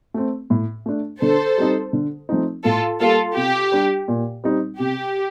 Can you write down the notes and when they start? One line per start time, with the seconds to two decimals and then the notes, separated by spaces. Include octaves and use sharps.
0.14 A3 C4
0.50 A2
0.86 A3 D4
1.21 D3 A4 C5
1.57 G3 C4 D#4
1.93 D3
2.29 F3 A3 C4 D#4
2.64 A2 F4 A4
3.01 G3 A#3 F4 A4
3.36 C3 G4
3.72 G3 D4
4.08 A#2
4.44 G3 C4 D#4
4.79 C3 G4